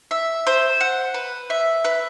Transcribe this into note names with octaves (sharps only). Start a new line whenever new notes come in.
E5
C5
F#5
B4
E5
B4